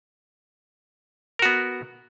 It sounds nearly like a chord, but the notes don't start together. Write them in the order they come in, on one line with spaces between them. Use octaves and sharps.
A#4 F#4 B3